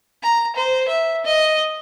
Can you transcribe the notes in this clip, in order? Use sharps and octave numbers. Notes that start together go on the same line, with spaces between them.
A#5
C5
E5
D#5